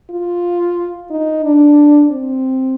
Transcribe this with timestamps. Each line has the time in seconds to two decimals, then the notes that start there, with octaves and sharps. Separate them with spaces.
0.10 F4
1.10 D#4
1.45 D4
2.11 C4